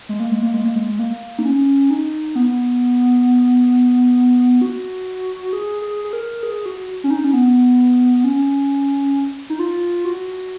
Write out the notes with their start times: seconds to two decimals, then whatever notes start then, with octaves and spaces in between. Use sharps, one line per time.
0.09 G#3
0.20 A#3
0.32 G#3
0.43 A#3
0.54 G#3
0.64 A#3
0.76 G#3
0.99 A#3
1.39 D#4
1.45 C#4
1.90 D#4
2.36 B3
4.62 F#4
5.53 G#4
5.82 G#4
6.05 G#4
6.13 A#4
6.43 G#4
6.66 F#4
7.04 C#4
7.10 D#4
7.24 C#4
7.33 B3
8.24 C#4
9.50 D#4
9.59 F4
10.05 F#4